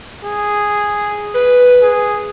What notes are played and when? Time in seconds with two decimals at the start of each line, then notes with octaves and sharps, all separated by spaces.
0.25 G#4
1.34 B4
1.82 G#4